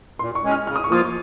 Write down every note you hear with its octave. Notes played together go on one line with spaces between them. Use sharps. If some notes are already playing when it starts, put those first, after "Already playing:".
A#2 C6
C#6
G#3 C#4
F6
C#3 F6
D#6
C#6
F3 A#3 F4 D#6